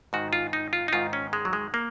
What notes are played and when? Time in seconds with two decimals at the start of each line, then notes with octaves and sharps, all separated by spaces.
0.13 G#2 D#3 F#4
0.33 F4
0.53 D#4
0.73 F4
0.88 D#4
0.93 G#2 D#3 F4
1.13 C#4
1.33 G#3
1.45 F#3
1.53 G#3
1.74 A#3